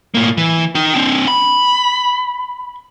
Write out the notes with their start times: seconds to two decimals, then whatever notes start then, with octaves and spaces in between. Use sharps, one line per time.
0.14 A2 A#3
0.37 E3
0.75 D#4 G5
0.95 C4 D4
1.28 B5